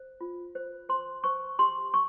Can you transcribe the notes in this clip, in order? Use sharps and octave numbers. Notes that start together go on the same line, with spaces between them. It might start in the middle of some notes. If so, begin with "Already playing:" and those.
Already playing: C5
F4
C5
C5 C6
C5 C#6
G4 C6
C#6